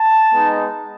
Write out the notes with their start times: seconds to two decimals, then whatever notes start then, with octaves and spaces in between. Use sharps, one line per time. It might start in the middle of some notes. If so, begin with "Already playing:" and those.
Already playing: A5
0.33 G#3 B3 D#4